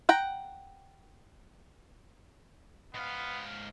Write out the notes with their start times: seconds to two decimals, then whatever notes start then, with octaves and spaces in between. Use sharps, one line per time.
0.09 F#5 G5 A#5
2.94 G#2 B3 F5